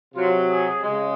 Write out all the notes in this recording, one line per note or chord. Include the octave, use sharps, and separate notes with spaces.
C3 F#3 F4
G#4
C#3 G#3